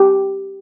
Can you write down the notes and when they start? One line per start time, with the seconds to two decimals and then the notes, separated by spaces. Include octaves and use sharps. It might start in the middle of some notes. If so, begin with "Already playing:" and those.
Already playing: G4